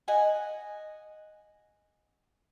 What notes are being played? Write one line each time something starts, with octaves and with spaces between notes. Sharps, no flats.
D#5 F#5 G#5